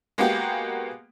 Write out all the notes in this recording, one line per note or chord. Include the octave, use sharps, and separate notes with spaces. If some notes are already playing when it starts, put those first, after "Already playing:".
G#3 A#3 B3 F#4 G4